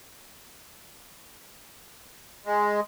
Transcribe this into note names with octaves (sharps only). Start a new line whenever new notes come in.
G#3